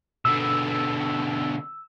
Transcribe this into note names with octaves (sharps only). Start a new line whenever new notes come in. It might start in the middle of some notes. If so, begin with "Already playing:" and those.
B2 D3 E6